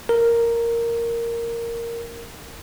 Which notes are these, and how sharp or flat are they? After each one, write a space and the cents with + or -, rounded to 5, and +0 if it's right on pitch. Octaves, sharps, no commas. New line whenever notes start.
A#4 -5